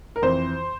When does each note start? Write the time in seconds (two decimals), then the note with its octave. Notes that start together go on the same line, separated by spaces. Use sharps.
0.16 A#4
0.22 F2 E3 C5